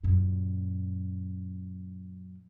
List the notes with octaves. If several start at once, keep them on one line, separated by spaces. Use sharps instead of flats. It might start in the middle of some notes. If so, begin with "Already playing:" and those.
F#2 A#2